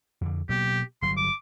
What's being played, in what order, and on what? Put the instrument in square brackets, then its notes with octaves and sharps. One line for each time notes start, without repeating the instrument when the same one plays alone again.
[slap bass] F2 D3
[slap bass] B2 F#3 A#3 [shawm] G4
[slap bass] G1 F#3 [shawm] C6
[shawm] D6